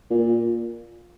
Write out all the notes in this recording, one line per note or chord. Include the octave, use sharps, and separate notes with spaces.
A#2